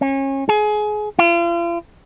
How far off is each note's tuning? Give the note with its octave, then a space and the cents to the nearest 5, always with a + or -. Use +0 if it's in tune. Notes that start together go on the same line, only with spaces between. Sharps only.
C#4 -30
G#4 +25
F4 -40